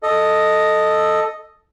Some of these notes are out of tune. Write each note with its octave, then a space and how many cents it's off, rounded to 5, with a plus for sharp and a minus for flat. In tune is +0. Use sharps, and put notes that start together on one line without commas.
A4 +0 D#5 +0